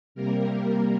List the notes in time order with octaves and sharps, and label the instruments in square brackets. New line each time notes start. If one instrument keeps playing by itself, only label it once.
[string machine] C3 G3 A#3 A#4